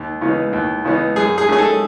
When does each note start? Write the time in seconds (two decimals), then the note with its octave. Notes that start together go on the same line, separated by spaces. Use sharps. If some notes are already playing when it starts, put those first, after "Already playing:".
Already playing: D#2
0.21 C#3 E3 B3 D#4
0.53 D#2
0.85 C#3 E3 B3 D#4
1.16 F#2 G#4
1.38 G#4
1.49 D#3 A3 C#4 G#4
1.58 A4